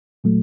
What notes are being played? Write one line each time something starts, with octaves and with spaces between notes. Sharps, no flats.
A#2 F#3 A3